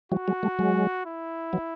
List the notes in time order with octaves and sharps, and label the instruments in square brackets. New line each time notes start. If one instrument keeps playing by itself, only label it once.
[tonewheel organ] F3 G3 [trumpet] F#4
[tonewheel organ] F#3 G#3
G3 A3
F#3 G#3
[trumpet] E4
[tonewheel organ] E3 F#3